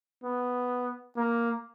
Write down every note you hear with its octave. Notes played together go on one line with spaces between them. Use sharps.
B3
A#3